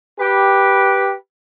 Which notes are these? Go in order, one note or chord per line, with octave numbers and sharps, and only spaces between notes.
G4 B4